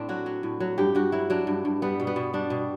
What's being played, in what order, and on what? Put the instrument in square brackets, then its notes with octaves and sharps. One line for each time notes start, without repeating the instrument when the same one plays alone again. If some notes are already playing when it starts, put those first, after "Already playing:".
Already playing: [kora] A2 C4 D4
F#3 F#4
F#3
A2
F#3
G2 G4
G2 F#4
F#3 E4
F#3 D4
G2
G2
G3 B3
B2
B3
B2
G3 D4
B2